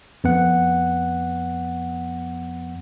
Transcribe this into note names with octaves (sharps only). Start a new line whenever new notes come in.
F2 B3 F#5